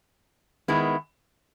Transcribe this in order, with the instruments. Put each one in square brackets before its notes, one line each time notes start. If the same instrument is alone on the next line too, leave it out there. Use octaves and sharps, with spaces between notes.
[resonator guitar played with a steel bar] D#3 G#3 B3 E4